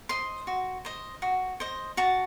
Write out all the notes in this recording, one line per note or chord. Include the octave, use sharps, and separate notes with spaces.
C5 D#5 C6
F#4
C5 D#5
F#4
C5 D#5
F#4 A5